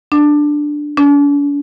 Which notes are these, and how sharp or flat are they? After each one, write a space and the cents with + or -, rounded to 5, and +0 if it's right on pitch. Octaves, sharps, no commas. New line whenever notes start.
D4 +5
D4 -45